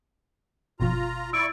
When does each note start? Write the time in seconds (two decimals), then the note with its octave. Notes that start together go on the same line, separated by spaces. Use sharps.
0.80 G1 B2 F3 F4 A#5
1.33 E4 D5 C#6 E6 D7